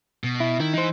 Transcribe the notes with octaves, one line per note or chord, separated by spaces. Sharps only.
B2
E4
D#3 E4
E3 D#4 C5